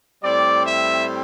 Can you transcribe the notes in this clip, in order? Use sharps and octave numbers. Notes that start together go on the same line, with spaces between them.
A2 G3 C4 D5
E5